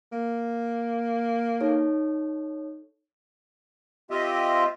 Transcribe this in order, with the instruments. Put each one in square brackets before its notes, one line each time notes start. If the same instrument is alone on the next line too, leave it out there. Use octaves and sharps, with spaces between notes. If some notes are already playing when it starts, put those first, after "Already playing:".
[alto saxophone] A#3
[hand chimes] D#4 A4 C#5
[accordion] C4 F4 G4 D#5 E5